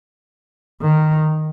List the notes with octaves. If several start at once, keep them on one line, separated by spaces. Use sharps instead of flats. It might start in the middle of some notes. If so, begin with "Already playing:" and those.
D#3